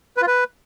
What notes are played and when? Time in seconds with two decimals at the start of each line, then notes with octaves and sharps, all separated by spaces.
0.17 B4
0.22 F4
0.27 B4